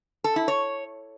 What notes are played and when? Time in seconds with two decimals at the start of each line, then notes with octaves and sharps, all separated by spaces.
0.24 A4
0.36 E4
0.48 C#5